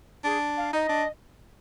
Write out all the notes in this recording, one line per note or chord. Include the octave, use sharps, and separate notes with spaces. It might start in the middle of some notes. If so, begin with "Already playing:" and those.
D4 G#4
F5
D#4 D#5
D4